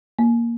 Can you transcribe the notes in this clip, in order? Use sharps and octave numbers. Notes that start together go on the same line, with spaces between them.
A#3